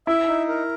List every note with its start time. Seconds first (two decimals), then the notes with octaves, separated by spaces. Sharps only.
0.07 E4 E5
0.27 D#4
0.48 A#4